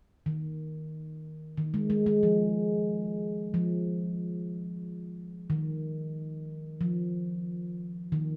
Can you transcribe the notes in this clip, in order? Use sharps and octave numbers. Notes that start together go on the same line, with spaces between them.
D#3
D#3
G#3
G#3
G#3
F3
F3
D#3
F3
D#3